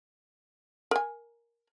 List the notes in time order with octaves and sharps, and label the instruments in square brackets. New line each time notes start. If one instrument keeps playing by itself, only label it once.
[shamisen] A#4 G#5